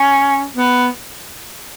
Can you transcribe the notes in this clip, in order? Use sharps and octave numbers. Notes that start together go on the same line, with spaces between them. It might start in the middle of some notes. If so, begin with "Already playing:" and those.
Already playing: C#4
B3